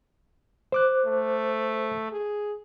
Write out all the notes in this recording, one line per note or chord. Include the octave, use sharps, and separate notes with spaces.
C5 D6 F#6
A3
G#4